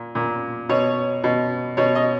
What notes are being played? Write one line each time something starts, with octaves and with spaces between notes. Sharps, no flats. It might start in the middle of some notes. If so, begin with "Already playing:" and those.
Already playing: A#2
A#2
B2 C#5
B2
B2 C#5
D#5